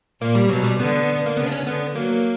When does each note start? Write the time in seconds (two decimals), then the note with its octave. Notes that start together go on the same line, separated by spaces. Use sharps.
0.21 A#2 A#3
0.35 G3
0.49 B2 F#3
0.63 G3
0.80 D3 B3
1.26 A#3
1.37 C#3 B3
1.46 D4
1.52 C#4
1.66 D3 B3
1.95 F#3 A#3